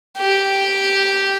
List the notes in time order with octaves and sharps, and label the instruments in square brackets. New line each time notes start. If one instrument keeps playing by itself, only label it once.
[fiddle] G4